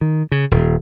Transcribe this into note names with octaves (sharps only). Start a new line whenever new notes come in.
D#3
C#3
D#1